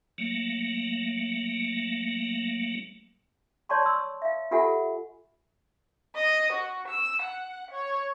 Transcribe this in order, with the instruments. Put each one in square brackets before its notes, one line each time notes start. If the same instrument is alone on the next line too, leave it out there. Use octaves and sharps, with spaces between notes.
[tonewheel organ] F#3 A3 A#3
[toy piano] C#5 D5 A5 C6 C#6
C6 E6
E5 F5
F4 G4 A4 E5 F#5 G#5
[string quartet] D#5
F#4
E6
F#5
C#5